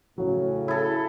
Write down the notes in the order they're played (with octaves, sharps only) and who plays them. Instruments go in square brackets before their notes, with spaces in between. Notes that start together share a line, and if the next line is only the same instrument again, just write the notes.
[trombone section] A2 C#3 [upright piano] F#3
[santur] E4 A4